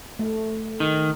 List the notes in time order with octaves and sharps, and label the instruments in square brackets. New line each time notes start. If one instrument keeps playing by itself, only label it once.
[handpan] A3
[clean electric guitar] D#3 [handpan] D#4